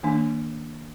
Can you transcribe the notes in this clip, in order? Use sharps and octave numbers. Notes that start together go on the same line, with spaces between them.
D#3 A#3 D4